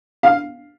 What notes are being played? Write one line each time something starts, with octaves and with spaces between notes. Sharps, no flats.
F5